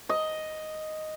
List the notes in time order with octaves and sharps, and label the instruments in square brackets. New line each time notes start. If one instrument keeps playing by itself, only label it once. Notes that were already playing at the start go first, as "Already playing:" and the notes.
[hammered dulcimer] D#5